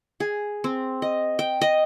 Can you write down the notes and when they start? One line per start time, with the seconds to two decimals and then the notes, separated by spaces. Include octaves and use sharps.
0.20 G#4
0.64 C4
1.02 D#5
1.39 G5
1.61 D#5